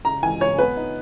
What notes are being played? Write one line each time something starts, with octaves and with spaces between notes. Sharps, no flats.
C#3 A#5
E3 G#5
C#3 C#5
B3 B4
D#4